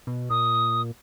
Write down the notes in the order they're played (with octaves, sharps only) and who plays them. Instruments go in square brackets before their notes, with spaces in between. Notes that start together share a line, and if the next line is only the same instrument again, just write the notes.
[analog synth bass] B2
[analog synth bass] A#2 [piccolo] D#6